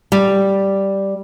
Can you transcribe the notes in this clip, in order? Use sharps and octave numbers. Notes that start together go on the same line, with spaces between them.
G3